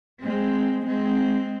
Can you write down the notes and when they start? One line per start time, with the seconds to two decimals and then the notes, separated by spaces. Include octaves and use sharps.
0.22 G#3 C4
0.86 G#3 C4